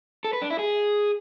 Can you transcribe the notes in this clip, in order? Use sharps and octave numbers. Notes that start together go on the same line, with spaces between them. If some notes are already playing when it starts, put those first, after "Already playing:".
A4
B4
D4
E4
G#4